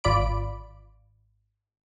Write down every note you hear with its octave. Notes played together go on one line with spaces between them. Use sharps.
G#1 F4 D5 B5 D7